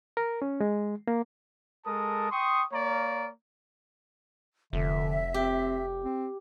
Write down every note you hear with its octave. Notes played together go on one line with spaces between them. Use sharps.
A#4
C#4
G#3
A#3
G#3 A4 A#4 A5 D#6
G5 C6 C#6 D#6
A#3 C#5 D5 F5 A#5
F1 D3 E5
C4 G4
C4